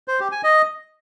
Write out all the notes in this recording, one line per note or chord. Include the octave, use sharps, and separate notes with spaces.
C5
G4
G#5
D#5